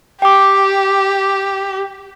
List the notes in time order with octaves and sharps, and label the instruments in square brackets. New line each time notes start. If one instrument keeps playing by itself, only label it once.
[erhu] G4 [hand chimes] G5 D6